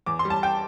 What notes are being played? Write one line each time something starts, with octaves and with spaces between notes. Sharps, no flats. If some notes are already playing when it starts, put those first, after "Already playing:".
E2 D6
C6
G3
A5
G5